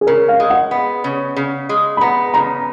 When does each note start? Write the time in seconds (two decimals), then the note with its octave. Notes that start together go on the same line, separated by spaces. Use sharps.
0.01 G#4
0.07 C#3 A#4
0.28 F5
0.40 G#3
0.50 F#5
0.71 B3
1.04 C#3
1.36 C#3
1.69 G#3
1.97 B5
2.01 B3 A#5
2.34 C#3 A#5